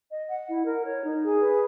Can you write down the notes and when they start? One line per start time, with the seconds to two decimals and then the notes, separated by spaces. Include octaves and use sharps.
0.11 D#5
0.29 F#5
0.47 E4
0.65 A#4
0.85 C#5
1.03 D#4
1.21 G#4
1.40 B4